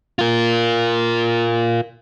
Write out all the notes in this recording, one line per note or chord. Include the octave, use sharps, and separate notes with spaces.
F4 A#4